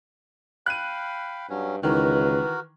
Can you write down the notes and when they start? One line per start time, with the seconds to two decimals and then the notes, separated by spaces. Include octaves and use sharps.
0.66 F5 G5 B5 F#6 D#7
1.49 G2 F#3 C#4
1.83 C#2 D#3 E3 F#4 A#4 B4